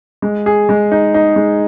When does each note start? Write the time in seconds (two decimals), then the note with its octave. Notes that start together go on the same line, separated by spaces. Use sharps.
0.22 G#3
0.46 G#4
0.69 G#3
0.92 D#4
1.14 D#4
1.36 G#3